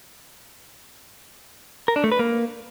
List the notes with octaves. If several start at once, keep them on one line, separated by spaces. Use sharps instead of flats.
A#4
D4
A3
B4
A#3